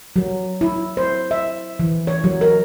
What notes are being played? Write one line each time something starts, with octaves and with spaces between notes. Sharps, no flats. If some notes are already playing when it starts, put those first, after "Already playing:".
F#3
E4
C5
E5
E3
C#5
F#3
A#4